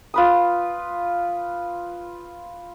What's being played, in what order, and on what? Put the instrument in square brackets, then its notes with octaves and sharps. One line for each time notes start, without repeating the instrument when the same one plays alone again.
[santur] F4 B4 D#6